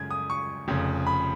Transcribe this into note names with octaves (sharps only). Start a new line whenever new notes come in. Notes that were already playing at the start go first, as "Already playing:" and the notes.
Already playing: F#2 C#3 G#3 G#6
D#6
C#6
F1 F2 C#3
B5